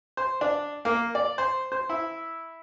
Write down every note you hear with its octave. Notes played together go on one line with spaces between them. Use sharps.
C5
D4
A#3
D5
C5
C5
E4